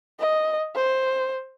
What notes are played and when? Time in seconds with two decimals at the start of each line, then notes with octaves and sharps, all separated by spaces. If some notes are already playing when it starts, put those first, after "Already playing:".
0.19 D#5
0.75 C5